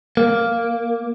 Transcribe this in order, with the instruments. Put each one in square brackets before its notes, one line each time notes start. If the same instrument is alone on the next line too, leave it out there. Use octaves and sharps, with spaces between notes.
[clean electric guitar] A#3